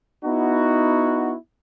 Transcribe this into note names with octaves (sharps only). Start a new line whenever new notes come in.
B3 D#4 E4 F#4